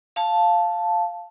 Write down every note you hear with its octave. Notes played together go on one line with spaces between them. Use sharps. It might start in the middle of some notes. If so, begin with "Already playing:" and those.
F5 A5